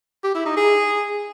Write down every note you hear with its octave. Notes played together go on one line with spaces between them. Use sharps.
G4
E4
D#4
G#4